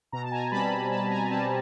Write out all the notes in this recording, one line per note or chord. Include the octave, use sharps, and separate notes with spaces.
B2 A#5
A5
G#5 A#5
G3 C4 A5 B5
B2 A5 B5
G#5 A#5
G3 C4 A5 B5